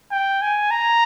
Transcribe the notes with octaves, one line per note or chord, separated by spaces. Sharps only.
G5
G#5
A#5